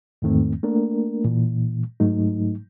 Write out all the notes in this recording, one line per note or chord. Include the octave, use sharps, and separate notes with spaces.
E2 G#2 D#3 A3 C4
A3 A#3 D4 A#4
A#2 E3
G#2 F#3 A3 D#4